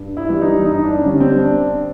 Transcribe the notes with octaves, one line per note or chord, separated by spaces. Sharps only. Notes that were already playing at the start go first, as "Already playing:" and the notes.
Already playing: G2
E4
E3 G3
D#4
G2 D#4
D4
D3 G3 C#4
C4
D4